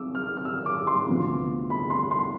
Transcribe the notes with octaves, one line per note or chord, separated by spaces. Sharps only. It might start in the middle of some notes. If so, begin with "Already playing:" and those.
Already playing: D6 E6
F6
F6
E6
D6
C6
D2 C3 F3 B3
B5
C6
C6